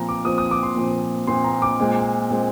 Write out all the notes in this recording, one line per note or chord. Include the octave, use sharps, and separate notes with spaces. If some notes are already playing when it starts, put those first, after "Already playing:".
Already playing: A#2 F3 C4 A#5
D6
A#2 F3 C4 D#6
D#6
D6
C6
A#2 F3 C4
A#2 F3 C4 C6
A#5
D6
A#2 G#3 C4
A#2 G#3 C4